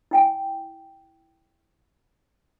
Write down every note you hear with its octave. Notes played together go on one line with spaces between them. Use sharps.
E4 G5 G#5